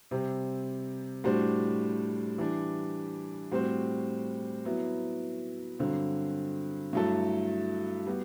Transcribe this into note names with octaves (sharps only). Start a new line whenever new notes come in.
C3 G3 C4 G4
A2 G3 D4 F#4 C5
E3 G3 D4
A2 G3 C4 F#4 C5
F#3 B3 E4
G2 D3 F#3 C4
G2 F#3 A3 E4 A4
G3 B3 F#4